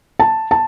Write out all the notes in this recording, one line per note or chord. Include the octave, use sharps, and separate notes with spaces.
A5
A5